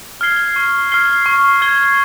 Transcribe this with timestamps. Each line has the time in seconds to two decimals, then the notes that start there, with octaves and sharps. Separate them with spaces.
0.21 F6 G#6 C7 G7
0.56 C#6
0.92 F6 G#6 C7 G7
1.26 C#6
1.61 F6 G#6 C7 G7